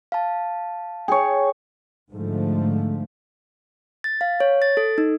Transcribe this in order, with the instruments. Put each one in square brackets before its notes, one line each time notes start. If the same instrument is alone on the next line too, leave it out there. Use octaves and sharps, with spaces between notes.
[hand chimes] F5 A5
[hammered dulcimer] G#4 C#5 [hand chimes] G5
[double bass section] G#2 D3 F3 A3
[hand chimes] A6
F5
C#5
A6
A4
D#4